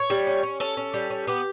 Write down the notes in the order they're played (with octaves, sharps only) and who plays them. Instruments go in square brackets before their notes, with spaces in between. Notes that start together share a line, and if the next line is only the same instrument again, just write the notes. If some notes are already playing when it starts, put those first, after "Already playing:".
Already playing: [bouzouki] C#5
G3
C#4
C#4
C#4 A4
C#4
G3
C#4
B3 G4